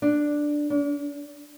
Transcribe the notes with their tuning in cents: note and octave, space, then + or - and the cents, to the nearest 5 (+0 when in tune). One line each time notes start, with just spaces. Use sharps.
D4 +5
D4 -40